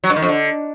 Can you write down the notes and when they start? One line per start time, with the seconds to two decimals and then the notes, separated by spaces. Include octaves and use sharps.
0.04 F#3
0.10 G2
0.16 D#3
0.22 F2
0.29 D3